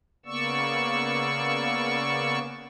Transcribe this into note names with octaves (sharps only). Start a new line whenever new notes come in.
C#3 A#3 B3 D5 C#6 E6